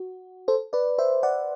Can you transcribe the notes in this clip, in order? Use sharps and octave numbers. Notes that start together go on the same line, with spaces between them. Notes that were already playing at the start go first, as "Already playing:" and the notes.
Already playing: F#4
A4 C5
B4 D5
C5 E5
D5 F#5